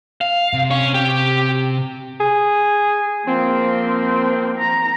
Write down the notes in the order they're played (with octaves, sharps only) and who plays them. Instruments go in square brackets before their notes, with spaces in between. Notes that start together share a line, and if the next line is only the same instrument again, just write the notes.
[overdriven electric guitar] F5
[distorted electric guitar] C3
[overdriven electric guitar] C#4 C#5
G4
[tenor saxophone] G#4
[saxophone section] F3 C4 [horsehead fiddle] A#3
[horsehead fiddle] A#5